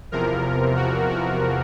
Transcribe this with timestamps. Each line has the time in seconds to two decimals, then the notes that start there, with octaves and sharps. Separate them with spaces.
0.12 E2 C3 F3 A#4
0.76 F#4
1.09 F#4